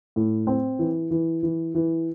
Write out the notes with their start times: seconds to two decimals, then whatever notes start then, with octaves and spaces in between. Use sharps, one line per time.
0.16 A2
0.47 C4
0.79 E3
1.11 E3
1.43 E3
1.75 E3